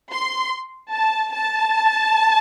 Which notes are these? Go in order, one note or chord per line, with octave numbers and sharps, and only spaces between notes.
C6
A5
A5